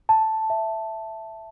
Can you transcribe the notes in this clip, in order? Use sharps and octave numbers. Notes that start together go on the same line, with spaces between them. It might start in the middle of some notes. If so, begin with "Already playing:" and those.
A5
E5